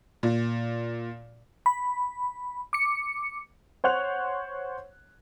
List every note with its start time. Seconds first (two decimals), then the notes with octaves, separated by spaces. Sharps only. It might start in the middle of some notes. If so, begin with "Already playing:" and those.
0.23 A#2
1.66 B5
2.73 D6 C#7
3.84 C5 C#5 F#5 F#6 F7